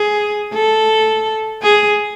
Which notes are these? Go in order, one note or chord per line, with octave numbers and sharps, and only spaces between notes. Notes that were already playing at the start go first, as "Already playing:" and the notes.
Already playing: G#4
A4
G#4